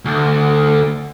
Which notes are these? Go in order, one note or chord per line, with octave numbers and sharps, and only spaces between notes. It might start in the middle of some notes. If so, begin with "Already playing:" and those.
D2